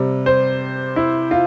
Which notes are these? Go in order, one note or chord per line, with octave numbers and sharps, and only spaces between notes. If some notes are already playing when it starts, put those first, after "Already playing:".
Already playing: C3 G3
C5
E4
F4